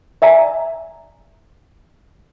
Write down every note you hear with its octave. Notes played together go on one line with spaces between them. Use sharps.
D5 E5 G#5 A#5